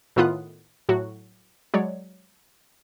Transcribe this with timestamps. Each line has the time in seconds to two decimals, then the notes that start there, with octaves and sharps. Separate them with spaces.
0.16 A2 D#3 B3 F4 D#6 F#6
0.89 A2 F#3 F#4
1.74 F#3 G#3 C#5 D5